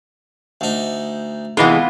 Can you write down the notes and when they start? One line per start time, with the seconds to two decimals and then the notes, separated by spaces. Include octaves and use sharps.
0.61 D2 D#4
1.57 C3 E3 G#3 B3 F4